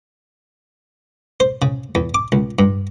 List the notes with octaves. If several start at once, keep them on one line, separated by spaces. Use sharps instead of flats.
C5
C#3
E2
D6
C#2
G2